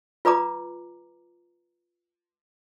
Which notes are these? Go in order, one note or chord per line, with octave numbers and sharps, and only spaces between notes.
F4 B4 D5 A#5 D6